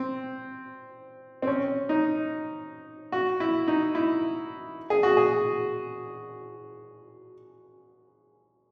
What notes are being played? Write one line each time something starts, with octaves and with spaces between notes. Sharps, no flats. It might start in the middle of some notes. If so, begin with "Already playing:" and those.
Already playing: C4
C4
C#4
D#4
F#4
E4
D#4
E4
G#4
F#4
G#4